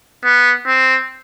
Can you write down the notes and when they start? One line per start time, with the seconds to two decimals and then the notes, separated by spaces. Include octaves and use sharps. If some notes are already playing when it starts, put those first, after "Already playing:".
0.24 B3
0.67 C4